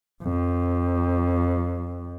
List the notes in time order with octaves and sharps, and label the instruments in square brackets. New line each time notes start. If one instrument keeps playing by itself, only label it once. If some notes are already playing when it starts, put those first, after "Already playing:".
[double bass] F2